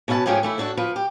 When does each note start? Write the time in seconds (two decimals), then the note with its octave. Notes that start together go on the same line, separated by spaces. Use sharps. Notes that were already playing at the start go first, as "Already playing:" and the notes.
0.08 B2 C#4 B4 E5 A5
0.26 G#2 F3 A3 C#4 G4 G#4
0.43 E3 A3 E4
0.58 A2 D4 F#4 A4
0.77 F3 B4
0.96 G4